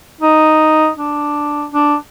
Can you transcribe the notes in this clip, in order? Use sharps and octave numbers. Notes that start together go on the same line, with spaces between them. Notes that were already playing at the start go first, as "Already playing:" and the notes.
D#4
D4
D4